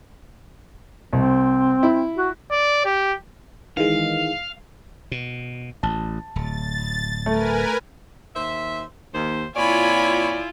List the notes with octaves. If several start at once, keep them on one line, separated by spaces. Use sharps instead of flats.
C2 C4
E4
F#4
D5
G4
D#3 E3 G#3 F5
B2
A1 A5
D1 A6
A3 A#4 B4 G#5
D#2 C5 E5
D#2 C5
A#2 C4 E4 F4 C#5 D5 G#5 B5